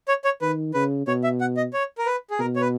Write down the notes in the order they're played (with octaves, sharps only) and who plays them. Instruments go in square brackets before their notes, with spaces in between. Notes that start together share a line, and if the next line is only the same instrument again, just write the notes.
[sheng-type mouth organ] C#5
C#5
[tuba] D#3 [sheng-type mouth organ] B4
[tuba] C#3 [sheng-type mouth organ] B4
[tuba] B2 [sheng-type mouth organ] C#5
[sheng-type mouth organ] E5
F#5
D#5
C#5
A#4
B4
G#4
[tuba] B2 [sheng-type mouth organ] A#4
[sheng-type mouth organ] C#5
B4